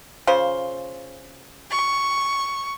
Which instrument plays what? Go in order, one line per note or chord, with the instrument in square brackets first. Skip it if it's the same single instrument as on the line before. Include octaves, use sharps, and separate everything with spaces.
[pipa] C#3 F4 C5
[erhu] C#6